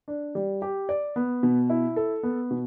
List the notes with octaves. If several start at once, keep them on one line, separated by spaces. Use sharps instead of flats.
D4
G3
G4
D5
B3
B2
E4
A4
B3
B2